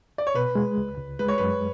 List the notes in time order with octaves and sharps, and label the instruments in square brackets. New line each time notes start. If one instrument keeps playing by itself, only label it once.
[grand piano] D5
C#5
[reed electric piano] B2 [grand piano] B4
[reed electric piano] G#3
C#2
C#2
[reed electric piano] G#3 [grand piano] B4
[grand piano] C#5
[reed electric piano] F#2 [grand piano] B4